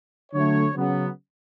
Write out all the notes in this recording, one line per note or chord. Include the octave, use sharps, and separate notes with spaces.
D3 F#3 A3 C#5
C#3 F#3 B3